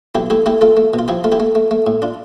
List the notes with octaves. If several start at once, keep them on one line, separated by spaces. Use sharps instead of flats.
B1 E4 G4
A3 E4 G4
A3 E4 G4
A3 F4 A4
A3
B2
F4
F3 E4 G4
A3 F4
E4 G4
A3
A3
A3
A2
D4 F4